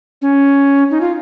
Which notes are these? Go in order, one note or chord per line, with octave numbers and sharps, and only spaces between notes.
C#4
D#4
F4